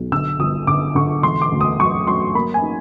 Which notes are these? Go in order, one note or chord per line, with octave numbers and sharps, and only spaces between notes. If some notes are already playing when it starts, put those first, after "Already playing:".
Already playing: B1
D3 E6
G1 D#6
D3 D6
D3 C#6
E1 C6
D6
D2
D#6
F#3 C#6
F#3 C6
A#3 B5
G#5
D#4